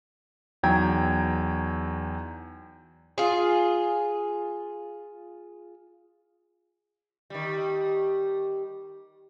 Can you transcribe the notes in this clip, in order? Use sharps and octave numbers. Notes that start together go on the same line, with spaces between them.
E2 F#3 D#4 G5 A#5 G#6
F4 G#4
D#3 G3